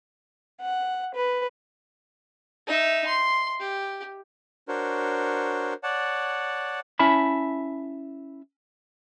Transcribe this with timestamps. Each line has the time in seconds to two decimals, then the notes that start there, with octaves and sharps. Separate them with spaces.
0.61 F#5
1.15 B4
2.67 D#4 E5
3.06 C6
3.60 G4
4.68 D4 F#4 A#4 C5 C#5
5.83 C#5 D5 F#5 A5
6.99 C#4 E4 E5 A5 B5